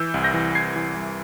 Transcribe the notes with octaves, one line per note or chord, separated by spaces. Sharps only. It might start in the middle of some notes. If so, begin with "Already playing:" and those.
Already playing: E3 E6 G6
C2
G6 A#6
E3
C2 G#6 C7
E3
C2